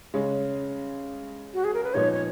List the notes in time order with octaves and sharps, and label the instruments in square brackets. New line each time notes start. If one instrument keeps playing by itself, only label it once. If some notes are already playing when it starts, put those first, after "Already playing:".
[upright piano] C#3 G#3 C#4
[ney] F#4
G#4
A#4
B4
[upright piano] A#2 F3 B3 D#4 [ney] C#5
[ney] C#5